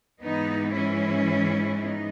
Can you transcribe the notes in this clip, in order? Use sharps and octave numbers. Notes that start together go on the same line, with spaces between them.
G#2 E3 B3 D#4
C#4 E4
B3 D#4